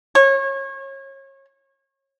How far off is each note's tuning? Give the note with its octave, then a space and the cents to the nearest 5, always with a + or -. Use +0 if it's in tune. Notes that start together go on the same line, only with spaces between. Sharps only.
C#5 -30